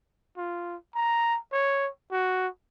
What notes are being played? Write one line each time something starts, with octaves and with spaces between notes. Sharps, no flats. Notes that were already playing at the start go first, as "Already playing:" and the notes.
F4
A#5
C#5
F#4